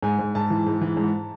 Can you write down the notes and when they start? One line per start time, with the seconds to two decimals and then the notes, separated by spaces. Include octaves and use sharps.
0.02 G#2 G#5
0.19 G#2
0.35 G#2 A5
0.50 E3
0.67 G#2
0.81 E3
0.97 G#2